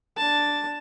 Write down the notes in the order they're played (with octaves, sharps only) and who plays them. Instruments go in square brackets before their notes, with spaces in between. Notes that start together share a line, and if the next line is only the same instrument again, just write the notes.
[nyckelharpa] D4 A5